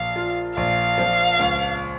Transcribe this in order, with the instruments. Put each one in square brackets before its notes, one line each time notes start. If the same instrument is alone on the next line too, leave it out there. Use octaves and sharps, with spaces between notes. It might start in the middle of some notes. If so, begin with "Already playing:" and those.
Already playing: [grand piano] A#1 [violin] F5
[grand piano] F4
[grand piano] A#1 [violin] F5
[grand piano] F3
C#2